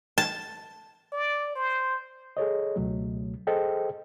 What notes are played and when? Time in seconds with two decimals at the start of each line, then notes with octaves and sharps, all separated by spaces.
0.18 A5
1.13 D5
1.55 C5
2.37 G#4 A4 C#5 D#5
2.76 C#2 B2 F#3 A3
3.47 G#4 A4 C5 D#5 G5